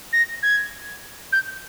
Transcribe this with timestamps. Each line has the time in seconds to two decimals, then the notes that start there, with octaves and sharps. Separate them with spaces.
0.13 A#6
0.43 G#6
1.32 G6